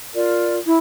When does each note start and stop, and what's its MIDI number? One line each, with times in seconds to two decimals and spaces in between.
0.14 0.58 65
0.14 0.58 70
0.14 0.58 74
0.66 0.78 64